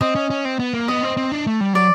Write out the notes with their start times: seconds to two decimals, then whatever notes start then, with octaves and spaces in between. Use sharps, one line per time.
0.01 C4 D#5
0.15 C#4
0.30 C#4
0.45 C4
0.59 B3
0.74 A#3
0.88 B3 D#5
1.03 C4
1.17 C4
1.32 D4
1.47 A3
1.61 G3
1.73 F#3 D5